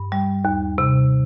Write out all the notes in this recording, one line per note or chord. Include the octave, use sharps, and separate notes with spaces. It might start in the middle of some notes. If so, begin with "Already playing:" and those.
Already playing: G2
G3
D#2
C3